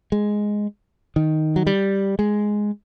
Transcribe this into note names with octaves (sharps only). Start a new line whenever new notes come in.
G#3
D#3
F#3
G3
G#3